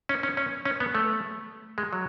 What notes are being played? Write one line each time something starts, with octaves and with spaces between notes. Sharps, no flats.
C#4
C#4
C#4
C#4
B3
A3
G#3
F#3